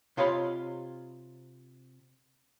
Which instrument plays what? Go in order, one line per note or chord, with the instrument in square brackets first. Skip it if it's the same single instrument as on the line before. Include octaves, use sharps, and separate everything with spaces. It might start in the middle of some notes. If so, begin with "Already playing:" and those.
[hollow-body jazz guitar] C3 F4 C#5 D#5 F5 B5